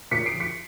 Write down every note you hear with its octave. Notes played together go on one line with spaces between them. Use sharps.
A#2 B6 C#7
C7 D7
F3
B6 C#7